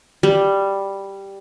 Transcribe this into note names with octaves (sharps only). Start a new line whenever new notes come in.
G3